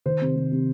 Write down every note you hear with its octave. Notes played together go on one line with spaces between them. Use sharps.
D#3 C5
C3
C3
C3